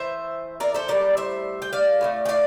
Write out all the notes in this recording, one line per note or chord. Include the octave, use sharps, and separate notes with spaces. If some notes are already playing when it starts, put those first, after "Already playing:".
Already playing: A2 E3 C5 E5
A#4 D5
A4 C5
A2 G3 A#4 D5
C5 E5
G5
D5 F5
A2 E3 A3
G5
D5 F5